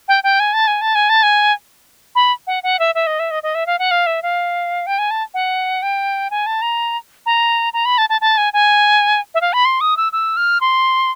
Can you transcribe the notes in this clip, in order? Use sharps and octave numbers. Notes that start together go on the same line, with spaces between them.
G5
G5
G#5
A5
G#5
A5
G#5
A5
G#5
B5
F#5
F#5
E5
E5
D#5
E5
D#5
D#5
E5
F5
F#5
F5
E5
F5
G5
G#5
A5
F#5
G5
G#5
A5
A#5
A#5
A#5
B5
A5
A5
A5
G#5
G#5
E5
F5
B5
C6
D#6
E6
E6
F6
C6